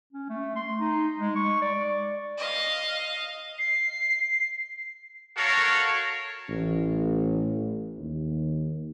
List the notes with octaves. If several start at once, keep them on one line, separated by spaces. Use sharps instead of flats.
C#4
A3
C6
D#4
G#3
C#6
D5
D#5 F5
C7
F#4 A4 A#4 C#5 F5
A1
D#2